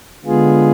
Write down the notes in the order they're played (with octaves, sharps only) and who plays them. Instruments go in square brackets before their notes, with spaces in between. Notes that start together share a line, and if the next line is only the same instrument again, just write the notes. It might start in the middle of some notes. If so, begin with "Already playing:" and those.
[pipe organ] D3 G#3 B3 F4 G#4